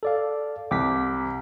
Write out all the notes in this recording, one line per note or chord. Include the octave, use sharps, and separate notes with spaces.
A4 D5 F5
C2 D6 B6